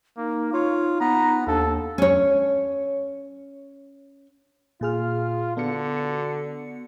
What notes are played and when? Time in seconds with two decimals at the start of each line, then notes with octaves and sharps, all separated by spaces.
0.17 A#3 D#4
0.53 F4 C#5
1.01 B3 A#5
1.47 D#2 D4 A4
1.98 C#4 C#5
4.81 A#2 F4 G#4 F6
5.57 D3 B3 F#4 C#7